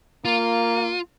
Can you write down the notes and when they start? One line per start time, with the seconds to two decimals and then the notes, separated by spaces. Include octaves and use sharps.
0.25 A#3 F4